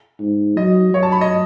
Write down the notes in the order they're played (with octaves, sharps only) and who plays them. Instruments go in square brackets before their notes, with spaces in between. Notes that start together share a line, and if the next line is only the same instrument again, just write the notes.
[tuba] G#2
[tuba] F#3 [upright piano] D#5
[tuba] F#3 [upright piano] C#5
[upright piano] A5
B5
D#5